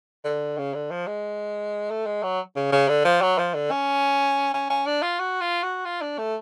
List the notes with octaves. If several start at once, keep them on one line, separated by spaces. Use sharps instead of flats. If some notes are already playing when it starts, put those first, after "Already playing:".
D3
C#3
D3
F3
G#3
A3
G#3
F#3
C#3
C#3
D3
F3
F#3
F3
D3
C#4
C#4
C#4
D4
F4
F#4
F4
F#4
F4
D4
A3